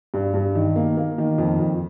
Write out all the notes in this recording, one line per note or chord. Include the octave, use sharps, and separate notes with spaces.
G2
G2
D#3
A#3
A#3
D#3
F2
F2